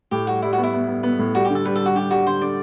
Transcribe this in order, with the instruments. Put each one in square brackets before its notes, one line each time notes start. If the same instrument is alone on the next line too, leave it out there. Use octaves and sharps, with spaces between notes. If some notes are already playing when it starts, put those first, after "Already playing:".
[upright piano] A2 [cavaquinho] G4
[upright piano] G3 [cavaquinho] F#4
[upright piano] G3 [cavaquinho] E4
[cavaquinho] F#4
[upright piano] B3
[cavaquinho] E4
[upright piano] B3
B3
B3
A2
[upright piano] G3 [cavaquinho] F#4
[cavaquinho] G4
[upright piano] D3
[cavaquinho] A4
[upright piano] G3 [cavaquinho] B4
[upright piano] G3 [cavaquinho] A4
[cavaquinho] F#4
[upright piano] D3 [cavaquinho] G4
[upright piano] G3 [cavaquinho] F#4
[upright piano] D3 [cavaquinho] C5
[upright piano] D3 [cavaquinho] D5